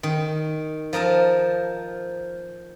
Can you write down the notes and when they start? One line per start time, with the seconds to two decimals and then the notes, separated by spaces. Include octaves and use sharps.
0.03 D#3
0.93 F3 A#4 D#5 A5